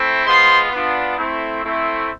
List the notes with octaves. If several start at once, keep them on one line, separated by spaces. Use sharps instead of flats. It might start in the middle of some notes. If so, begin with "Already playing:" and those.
Already playing: A3 C4 E4
G#3 B3 F4 C5 C6
B3 D4 F4
A3 C4 E4
A3 C4 E4